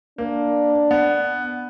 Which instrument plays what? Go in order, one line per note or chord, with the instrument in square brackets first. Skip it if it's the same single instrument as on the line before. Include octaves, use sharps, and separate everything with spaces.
[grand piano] A#3 [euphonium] D4
[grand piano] B3